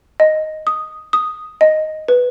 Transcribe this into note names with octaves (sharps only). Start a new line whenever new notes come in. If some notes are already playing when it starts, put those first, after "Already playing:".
D#5
D#6
D#6
D#5
B4